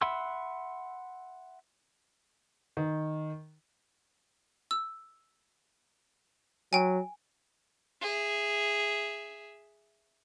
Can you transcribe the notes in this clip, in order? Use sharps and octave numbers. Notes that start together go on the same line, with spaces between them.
E5 F#5 B5 C6 E6
D#3
E6
F#3 G5 G#5
G#4 E5